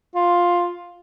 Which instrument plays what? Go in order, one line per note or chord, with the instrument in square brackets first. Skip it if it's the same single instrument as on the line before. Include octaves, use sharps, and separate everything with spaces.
[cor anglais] F4